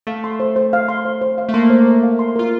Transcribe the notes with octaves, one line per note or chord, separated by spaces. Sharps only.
A3 F5
C6
C5
C5
F5
C6
C5
C5
F5
A3
A#3 C6
C5
C5
F5
C6
F4 A#4